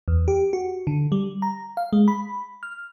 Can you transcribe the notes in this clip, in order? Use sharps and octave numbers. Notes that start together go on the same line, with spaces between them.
E2
G4
F#4
D3
G3
A#5
F5
G#3
B5
F6